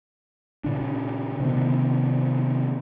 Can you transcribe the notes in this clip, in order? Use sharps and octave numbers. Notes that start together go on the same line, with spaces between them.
A#2 C#3 D4
C3 D#3 B3